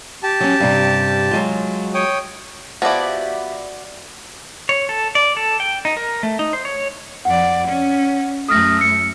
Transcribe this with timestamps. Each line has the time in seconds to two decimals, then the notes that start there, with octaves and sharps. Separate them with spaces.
0.23 G4 A5
0.40 F#3 C#4
0.60 G2 C3
1.31 F#3 G#3 F4
1.94 C#5 G5 D#6
2.82 F3 B3 E4 F#4 G4 D5 E5
4.69 C#5
4.89 A4
5.15 D5
5.37 A4
5.60 G5
5.85 D#4
5.97 A#4
6.23 A3
6.39 D#4
6.53 C5
6.65 C#5
7.25 F2 D5 F#5
7.67 C#4
8.49 F#2 A3 D#6 F6 A#6
8.78 E6 C#7